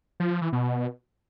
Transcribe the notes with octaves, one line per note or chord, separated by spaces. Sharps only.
F3
F3
E3
B2